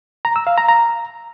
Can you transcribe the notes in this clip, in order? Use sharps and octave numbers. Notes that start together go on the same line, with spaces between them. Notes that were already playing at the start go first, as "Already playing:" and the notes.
A#5
E6
F5
A#5
A#5